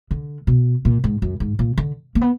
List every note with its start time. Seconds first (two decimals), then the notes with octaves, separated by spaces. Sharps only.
0.11 D3
0.47 B2
0.85 A#2
1.04 G#2
1.22 F#2
1.40 G#2
1.59 A#2
1.78 D3
2.15 A#3
2.21 B3